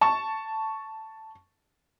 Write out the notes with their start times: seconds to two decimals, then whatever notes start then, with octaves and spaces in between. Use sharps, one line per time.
0.01 A5 C#6